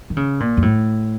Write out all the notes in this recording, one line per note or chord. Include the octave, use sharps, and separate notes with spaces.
D#3
C#3
A#2
F#2
A2